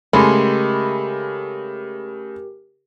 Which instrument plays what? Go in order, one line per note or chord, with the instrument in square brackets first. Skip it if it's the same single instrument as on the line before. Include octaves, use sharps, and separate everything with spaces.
[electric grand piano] C#3 A3 [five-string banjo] G#3 [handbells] G4 A#4 [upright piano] B5